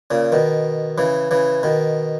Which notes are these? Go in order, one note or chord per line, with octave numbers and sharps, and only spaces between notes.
A#2 C#3
B2 D#3
C#3 E3
C#3 E3
B2 D#3